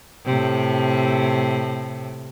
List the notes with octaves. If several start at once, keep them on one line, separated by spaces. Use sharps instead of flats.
A2 C3